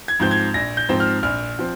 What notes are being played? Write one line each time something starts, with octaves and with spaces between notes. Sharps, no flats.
G#6
G#2 F3 C4 G6
G#6
A#1 A#6
G6
G#2 F3 C4
F6
A#1 F6
F3 C4